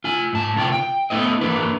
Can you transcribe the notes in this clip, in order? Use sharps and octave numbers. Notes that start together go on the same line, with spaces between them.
F4 G#5
G#2 A5
C3 F4 C#5 G5
G5
A3 B3 E4 C5 D#5
E3 A#3 D4 B4